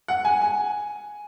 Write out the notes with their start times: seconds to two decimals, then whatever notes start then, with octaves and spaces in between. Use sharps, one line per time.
0.08 F#5
0.25 G#5
0.42 G#5